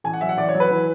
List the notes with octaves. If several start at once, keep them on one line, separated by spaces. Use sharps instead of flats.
A1 G#5
F#5
F#3 E5
F#5
A1 D5
C#5
F#3
B4
E3